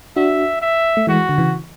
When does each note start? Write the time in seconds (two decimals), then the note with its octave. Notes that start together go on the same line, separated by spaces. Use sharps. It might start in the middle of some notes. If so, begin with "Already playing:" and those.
0.16 D4 F#4 E5
0.62 E5
0.97 A3
1.07 E3 G#3 F#4
1.29 D3
1.38 C#3 E3